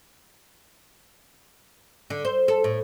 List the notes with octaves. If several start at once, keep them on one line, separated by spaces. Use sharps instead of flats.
D3
C5
A4
A2